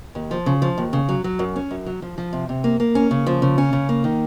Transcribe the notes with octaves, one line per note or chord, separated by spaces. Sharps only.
D#2
F3
C#3
F3
D#2
C#3
F#3
F#3
F#2
C#4
F#2
F#3
F3
F3
C3
C3
A#3
A#3
C#4
C#3
F3
C#3
C#4
C#3
A#3
D#3